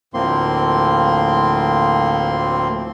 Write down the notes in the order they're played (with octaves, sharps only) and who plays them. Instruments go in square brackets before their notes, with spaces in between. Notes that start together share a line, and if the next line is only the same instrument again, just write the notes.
[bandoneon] D2 A2 F3 A#3 C4 C6